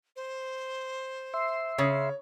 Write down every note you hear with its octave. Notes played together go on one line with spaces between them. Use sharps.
C5
E5 C6
C#3 C#5